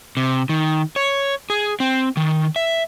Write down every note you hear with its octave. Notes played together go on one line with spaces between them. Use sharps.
C3
D#3
C#5
G#4
C4
D#3
E5